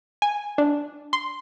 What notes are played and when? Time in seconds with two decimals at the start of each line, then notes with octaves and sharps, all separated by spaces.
0.22 G#5
0.58 D4
1.13 C6